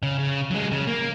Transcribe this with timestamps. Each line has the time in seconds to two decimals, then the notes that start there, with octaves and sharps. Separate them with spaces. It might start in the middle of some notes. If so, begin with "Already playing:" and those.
0.03 C#3
0.19 C#3
0.51 F#3 G#3
0.72 C#3
0.88 A#3